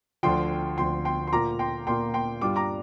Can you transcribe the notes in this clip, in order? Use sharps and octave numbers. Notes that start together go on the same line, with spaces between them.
D2 D3 F3 G5 C6
D2 D3 F3 G5 C6
G5 C6
C6
A#2 A#3 F4 A#5 D6
G5 C6
A#2 A#3 F4 G5 C6
G5 C6
G2 G3 D4 F4 D6
A#5 D6